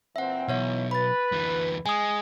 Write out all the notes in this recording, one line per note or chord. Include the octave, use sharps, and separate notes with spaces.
A#2 E3 C4 E5 F#5
B1 E3 B3 C#5 E5
B4 B5 A6
D2 E3
G#3 G#5 D#6